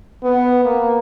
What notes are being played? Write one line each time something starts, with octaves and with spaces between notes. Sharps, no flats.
B3
A#3